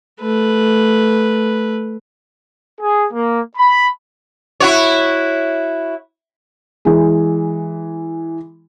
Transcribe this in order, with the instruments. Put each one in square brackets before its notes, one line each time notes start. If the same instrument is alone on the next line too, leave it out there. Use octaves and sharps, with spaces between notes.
[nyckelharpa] A3 B4
[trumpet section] G#4
A#3
B5
[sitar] E4 F#4 C#5
[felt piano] E3 G#3